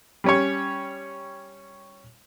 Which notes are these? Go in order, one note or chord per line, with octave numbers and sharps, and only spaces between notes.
G3 C#4 C#5